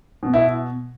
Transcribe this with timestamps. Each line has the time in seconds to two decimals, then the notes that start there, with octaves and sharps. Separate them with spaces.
0.23 B2
0.34 E4